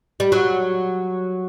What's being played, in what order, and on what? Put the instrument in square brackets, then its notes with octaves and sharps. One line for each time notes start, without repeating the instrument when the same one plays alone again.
[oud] G3
F#3